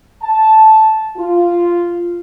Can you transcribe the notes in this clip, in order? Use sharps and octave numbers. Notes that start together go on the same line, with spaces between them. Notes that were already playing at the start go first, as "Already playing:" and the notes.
A5
F4